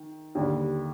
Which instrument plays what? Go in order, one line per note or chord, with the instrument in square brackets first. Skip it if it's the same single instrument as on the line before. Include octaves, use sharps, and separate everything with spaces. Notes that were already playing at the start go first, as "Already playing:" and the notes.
Already playing: [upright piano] D#3
D#2 D3 G3